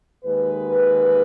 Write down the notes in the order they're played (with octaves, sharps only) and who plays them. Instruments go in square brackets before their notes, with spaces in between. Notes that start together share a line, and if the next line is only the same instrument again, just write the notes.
[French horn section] D#2 D#3 G#3 B4